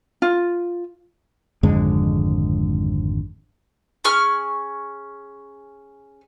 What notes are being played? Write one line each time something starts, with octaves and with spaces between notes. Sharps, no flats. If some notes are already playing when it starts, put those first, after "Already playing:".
F4
G#1 F2 D3 G#3
C#4 G#4 C#6 F6